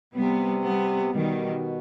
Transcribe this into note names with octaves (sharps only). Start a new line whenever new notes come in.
C3 G3 B3
G3 B3
B2 D#3 G3